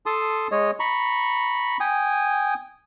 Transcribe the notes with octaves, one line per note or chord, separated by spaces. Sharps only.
A4 A5 C6 D#6
G#3 C#5 D#5
A#5 B5 C#6
G5 G#5 D#6